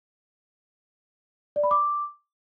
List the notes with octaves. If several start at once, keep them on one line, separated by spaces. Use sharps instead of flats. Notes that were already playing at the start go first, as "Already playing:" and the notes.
D5
B5
D6